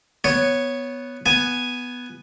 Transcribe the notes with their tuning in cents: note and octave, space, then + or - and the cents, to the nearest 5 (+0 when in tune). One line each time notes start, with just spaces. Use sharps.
B3 +0 C#5 +0
B3 +0 G#5 +0